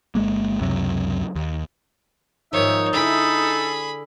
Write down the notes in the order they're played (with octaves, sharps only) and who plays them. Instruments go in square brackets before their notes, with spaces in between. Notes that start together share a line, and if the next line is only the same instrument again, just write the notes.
[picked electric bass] G1 G#3 A#3
C#2 F#2 C3 F#3
D#2
[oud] G#2 D#3 F3 [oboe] D#4 [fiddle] C#5 [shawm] E5
[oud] D3 E4 [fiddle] G#4 B5 [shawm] A4